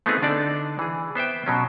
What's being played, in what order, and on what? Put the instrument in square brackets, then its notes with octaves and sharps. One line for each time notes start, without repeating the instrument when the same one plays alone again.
[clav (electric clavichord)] A3 B3 C4 D#4 F4 G#4
D3 D4 D#4 A4 D5
E3 G#4
B3 C5 E5 G5
B2 F#3 C#4